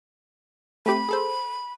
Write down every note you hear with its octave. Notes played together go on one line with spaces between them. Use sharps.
A3 C4 G4 B5
G#4 A4 C5